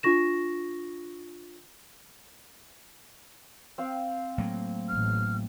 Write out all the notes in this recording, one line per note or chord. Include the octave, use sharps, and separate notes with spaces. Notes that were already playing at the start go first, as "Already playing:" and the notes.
D4 F4 C#6 A#6 E7
C4 F5 G5
A2 F#3 A#3
A1 F6